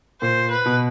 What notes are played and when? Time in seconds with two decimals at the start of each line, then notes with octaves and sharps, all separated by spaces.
0.21 A#2 C5
0.51 B4
0.66 B2